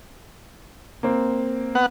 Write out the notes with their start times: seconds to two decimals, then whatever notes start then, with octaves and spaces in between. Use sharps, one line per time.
1.03 A#3 C4
1.75 B3 F#5